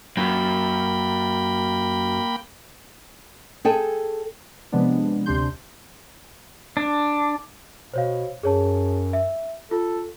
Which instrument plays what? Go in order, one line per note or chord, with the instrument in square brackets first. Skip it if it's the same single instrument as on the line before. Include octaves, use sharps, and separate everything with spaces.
[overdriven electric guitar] F#2 [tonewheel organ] A#3 G5 B5
[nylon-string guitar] G#4 A4 G5 G#5
[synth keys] C3 F3 G#3 B3 D4
D2 C3 D4 C6 G6
[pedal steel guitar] D4
[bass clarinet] B2 [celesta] C5 C#5 F5
[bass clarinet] F#2 [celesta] G#4 C#5 A5
[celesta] E5
[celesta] F4 [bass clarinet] A4